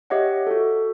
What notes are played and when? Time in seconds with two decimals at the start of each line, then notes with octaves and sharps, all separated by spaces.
0.10 G4 C#5 D#5 E5 F#5
0.47 F#4 A4